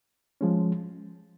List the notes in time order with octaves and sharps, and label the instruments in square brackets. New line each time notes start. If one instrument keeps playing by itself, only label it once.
[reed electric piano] F3 G#3 C#4